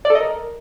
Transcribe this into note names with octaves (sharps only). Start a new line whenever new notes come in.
D5
A4
D#5
A#4